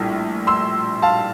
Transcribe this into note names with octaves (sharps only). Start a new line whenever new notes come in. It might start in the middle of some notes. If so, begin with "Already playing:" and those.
Already playing: A#1 A2 G3
C6 E6
F5 A5